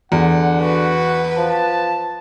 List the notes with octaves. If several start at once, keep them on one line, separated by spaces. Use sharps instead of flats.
E2 D3 F#5
F#4 B4
F3 A5